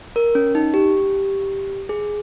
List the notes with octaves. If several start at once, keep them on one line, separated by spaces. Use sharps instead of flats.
A#4
C#4
D#4
G4
G#4